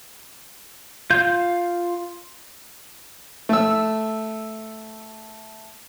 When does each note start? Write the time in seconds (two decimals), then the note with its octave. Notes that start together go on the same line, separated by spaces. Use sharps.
1.10 F4 F5 G6
3.49 A3 E6